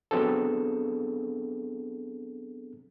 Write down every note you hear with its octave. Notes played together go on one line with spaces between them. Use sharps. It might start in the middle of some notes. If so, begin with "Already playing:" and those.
F#3 B3 C4 D4 G#4 A4